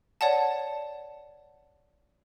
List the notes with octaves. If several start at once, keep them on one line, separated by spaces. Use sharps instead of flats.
C#5 D5 F#5 A5